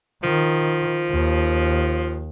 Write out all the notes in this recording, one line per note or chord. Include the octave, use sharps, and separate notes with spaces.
D#3 F3
D#2